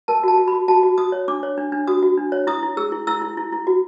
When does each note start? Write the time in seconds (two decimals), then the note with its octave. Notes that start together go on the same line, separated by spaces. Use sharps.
0.08 A#4 A5
0.23 F#4 A5
0.38 F#4
0.48 B5
0.52 F#4
0.68 F#4 A5
0.83 F#4
0.98 F#4 D#6
1.12 C#5
1.28 D4 D6
1.43 C#5
1.58 D4
1.72 D4
1.87 F#4 D#6
2.02 F#4
2.17 D4
2.32 C#5
2.47 E4 D#6
2.63 E4
2.77 G#4 E6
2.92 E4
3.07 E4 E6
3.22 E4
3.37 E4
3.52 E4
3.67 F#4